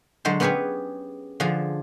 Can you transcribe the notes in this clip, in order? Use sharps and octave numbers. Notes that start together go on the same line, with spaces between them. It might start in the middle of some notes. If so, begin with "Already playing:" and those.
D3 F#3 G#3 C5
B3 C#4 G4 G#4 B4 C#5
D3 F3 D4 G#4